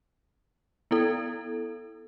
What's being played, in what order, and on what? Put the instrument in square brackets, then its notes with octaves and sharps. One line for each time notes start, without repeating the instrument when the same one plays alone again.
[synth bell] B3 E4 A4